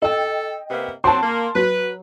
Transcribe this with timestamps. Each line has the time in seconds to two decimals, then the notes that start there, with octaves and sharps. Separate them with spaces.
0.02 A4 D#5 G5
0.70 C3 A#3 B3
1.04 F#3 C4 A5 C6
1.23 A#3
1.55 F#3 B4